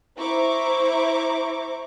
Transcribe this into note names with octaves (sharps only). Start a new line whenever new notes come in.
E4 C5 A#5 C#6 D6